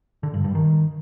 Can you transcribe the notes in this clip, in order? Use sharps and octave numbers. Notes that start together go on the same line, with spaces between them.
D3
G2
G2
D#3